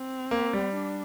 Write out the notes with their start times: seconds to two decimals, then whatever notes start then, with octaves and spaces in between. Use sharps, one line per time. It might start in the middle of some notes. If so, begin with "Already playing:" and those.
Already playing: C4
0.31 A#3
0.53 G3
0.75 D4